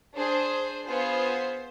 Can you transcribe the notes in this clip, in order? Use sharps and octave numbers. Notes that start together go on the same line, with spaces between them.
D4 G#4 C5
B3 F4 G#4 C5